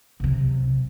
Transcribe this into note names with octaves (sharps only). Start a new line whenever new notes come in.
B1 C3